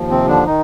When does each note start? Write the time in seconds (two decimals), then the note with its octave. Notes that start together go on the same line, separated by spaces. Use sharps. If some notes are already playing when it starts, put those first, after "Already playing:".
Already playing: D#2 F3
0.10 C3 C4
0.28 D3 D4
0.47 D#3 D#4